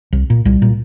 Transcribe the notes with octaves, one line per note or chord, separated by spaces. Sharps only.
C2
A#2
C2 G3
A#2